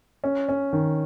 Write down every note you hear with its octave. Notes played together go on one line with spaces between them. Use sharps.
C#4
C#4
D#3